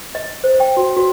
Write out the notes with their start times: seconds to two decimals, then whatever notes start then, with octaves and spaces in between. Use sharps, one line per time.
0.15 D#5
0.44 C5
0.60 G5
0.77 F#4
0.97 F#4